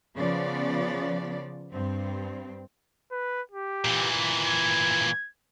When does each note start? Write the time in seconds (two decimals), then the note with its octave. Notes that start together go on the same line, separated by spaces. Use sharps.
0.15 C#3 F3 B3 D5
1.71 G2 C4
3.12 B4
3.52 G4
3.85 A#2 E3
4.47 G#6